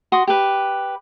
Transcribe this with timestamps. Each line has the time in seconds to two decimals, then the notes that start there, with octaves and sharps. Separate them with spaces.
0.12 F#4 C6 D#6
0.27 G4 B4